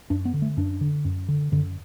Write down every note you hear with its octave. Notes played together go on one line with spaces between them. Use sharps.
F#2 D4
B3
D3
A3
F#2 D4
D3
F#2
D3
F#2 D3